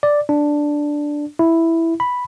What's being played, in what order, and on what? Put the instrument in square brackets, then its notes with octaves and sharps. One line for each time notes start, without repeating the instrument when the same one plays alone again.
[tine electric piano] D5
D4
E4
B5